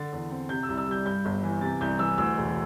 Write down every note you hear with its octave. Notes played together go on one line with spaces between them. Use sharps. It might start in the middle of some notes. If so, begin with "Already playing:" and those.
Already playing: D3 A6
E2
C4
C3 G6
E6
C2
E6
G3 G6
G2 G6
G1
E3
C3 A6
C2 G6
E3 E6
D2 E6
E1